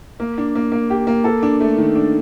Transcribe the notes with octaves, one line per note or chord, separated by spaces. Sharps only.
A#3
D4
A#3
A#3
G4
A#3
A4
D4
A3
D#3
D4